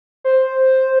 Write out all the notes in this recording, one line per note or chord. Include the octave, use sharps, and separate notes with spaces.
C5